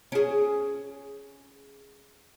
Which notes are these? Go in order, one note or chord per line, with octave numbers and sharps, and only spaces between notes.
C#4 G#4